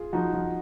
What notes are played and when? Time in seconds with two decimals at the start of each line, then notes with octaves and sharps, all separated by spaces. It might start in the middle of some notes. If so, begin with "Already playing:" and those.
Already playing: F4 G#4
0.13 F3 D#4 F#4
0.33 F3